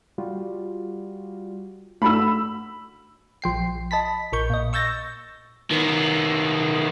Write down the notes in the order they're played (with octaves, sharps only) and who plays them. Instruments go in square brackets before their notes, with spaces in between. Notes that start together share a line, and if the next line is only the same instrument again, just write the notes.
[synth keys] G3 F4 F#4
[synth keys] A3 D4 F#4 [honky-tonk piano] B5 E6
[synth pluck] A#1 F3 G5 C7
D#5 A5 B5 B6
A#1 A#4 C#6 G6
A#2 D#5
C#6 E6 G6 A6 A#6
[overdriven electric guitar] D#3 B3